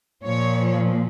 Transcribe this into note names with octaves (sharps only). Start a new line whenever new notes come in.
A#2 F3 C#5